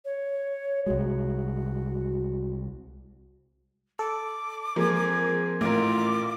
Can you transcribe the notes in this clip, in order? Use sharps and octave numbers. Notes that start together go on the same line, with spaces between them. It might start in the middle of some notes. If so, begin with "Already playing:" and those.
C#5
C2 G#3 F#4
A4 D6
F3 G#3 A#3 C4 G#5
A1 A2 F4 A#4 D6